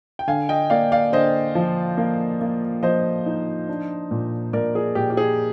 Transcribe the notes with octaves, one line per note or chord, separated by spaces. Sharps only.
G5
D3 F5 G#5
D#5 G5
A#3 D5 F5
D5 F5
D3 C5 D#5
F3
A#3
A#3
F3 C5 D#5
D#4
D4
A#2
A#2 A#4 D5
G#4
A#2 G4
G4
G#4